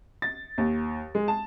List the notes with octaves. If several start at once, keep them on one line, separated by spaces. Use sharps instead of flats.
A6
D#2
G#3
A5